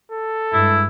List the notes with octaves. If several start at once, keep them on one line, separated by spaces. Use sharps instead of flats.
A4
G2 G#3 E4